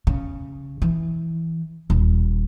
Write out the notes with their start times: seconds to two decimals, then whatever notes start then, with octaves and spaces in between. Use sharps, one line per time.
0.07 C#3
0.82 E3
1.90 D#1